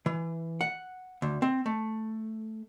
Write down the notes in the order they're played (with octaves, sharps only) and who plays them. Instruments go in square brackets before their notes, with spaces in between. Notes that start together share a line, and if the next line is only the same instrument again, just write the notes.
[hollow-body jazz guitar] E3
F#5
D2
C4
A3